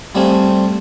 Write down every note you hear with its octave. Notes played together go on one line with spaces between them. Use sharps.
G3 A3 C4 G#4 C5 F5